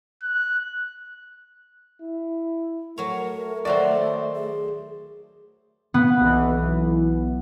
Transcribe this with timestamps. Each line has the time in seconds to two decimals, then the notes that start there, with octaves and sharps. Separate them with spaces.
0.23 F#6
2.01 E4
2.98 F#3 A3 A#4 C#5
3.65 D#3 F#3 F#4 C5 D5 E5
4.35 G#4
5.94 B3
6.21 B1 E3